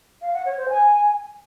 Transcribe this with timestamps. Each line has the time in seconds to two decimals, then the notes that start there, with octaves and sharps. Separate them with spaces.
0.22 F5
0.34 F#5
0.45 C#5
0.57 C5
0.69 G#5